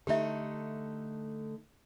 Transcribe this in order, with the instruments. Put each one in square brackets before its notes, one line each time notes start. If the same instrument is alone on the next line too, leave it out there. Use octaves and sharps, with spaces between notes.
[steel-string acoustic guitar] D3 A3 D#4 [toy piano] G4 E5